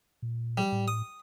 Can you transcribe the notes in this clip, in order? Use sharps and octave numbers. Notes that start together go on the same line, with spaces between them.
A#2
G3
A2
D#6